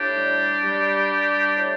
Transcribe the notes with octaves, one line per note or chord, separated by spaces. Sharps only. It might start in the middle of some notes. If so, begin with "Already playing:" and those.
Already playing: A2 D4 G4
G3
G3
G3
A2